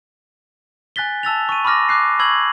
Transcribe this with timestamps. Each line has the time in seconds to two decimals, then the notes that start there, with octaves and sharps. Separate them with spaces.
0.96 G#5 F#6 A6 B6 G7
1.23 A5 E6 A6 F7
1.49 C#6 D#7
1.65 B5 C#6 D6 F6 A#6
1.89 D6 F#6 C7
2.19 B5 C#6 E6 G#6 F#7